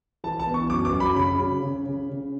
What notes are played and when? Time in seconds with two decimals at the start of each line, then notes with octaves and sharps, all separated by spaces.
0.24 E3 A5
0.39 A5
0.47 B3
0.54 C#6
0.70 F#2 D6
0.85 D6
0.93 F#2
1.00 B5
1.16 C#3 B5
1.39 C#3
1.63 C#3
1.86 C#3
2.09 C#3